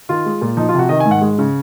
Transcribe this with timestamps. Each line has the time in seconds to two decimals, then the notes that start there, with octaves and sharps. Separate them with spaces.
0.09 D#3 F4
0.26 G#3
0.41 A#2
0.57 F3 D#4
0.69 F4
0.74 C3 F#4
0.89 D#3 D#5
1.00 G#5
1.06 G#2
1.11 F#5
1.21 G#3
1.38 C#3